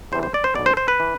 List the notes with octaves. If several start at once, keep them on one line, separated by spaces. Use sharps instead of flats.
E2 C3 E3 C5
C5
D5
C5
B1 B2 D5
C5
C5
B4
E3